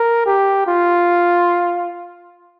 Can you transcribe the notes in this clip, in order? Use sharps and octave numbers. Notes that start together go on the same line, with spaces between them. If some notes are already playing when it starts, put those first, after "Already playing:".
Already playing: A#4
G4
F4